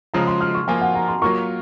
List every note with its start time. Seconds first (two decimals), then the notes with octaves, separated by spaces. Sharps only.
0.14 C#3 F3 G#3 A#5
0.27 C6
0.41 F6
0.55 C#6
0.68 F3 A#3 F4 G#5
0.81 F#5
0.95 A#5
1.08 C6
1.22 F#3 A#3 F4 A#4 C#6